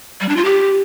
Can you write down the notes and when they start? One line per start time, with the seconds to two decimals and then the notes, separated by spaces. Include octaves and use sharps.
0.21 G3
0.29 D4
0.37 F4
0.45 G4